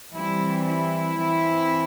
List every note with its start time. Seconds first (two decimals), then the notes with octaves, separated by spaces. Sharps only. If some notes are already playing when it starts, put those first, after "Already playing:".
0.13 E3 G3 C4 E4
0.66 E4
1.19 E3 C4